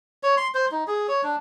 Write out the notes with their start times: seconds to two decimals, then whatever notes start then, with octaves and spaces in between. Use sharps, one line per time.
0.23 C#5
0.37 C6
0.55 C5
0.71 D#4
0.87 G#4
1.08 C#5
1.23 D4